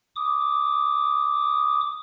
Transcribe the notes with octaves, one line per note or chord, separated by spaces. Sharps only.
D6 D#6